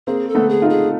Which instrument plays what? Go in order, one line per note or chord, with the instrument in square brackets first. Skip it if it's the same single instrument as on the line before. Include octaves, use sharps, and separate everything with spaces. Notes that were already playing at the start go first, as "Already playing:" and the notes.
[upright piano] A#3 C4 [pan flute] G#4
[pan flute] A4
[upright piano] A3 B3
[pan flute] G#4
[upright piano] D#4 F4
[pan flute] G#4